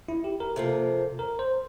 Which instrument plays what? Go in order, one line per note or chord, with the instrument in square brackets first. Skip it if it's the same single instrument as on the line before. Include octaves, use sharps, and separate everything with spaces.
[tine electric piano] E4
G4
A#4
[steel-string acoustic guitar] C3 F3 A#3 [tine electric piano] A4
[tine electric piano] A#4
C5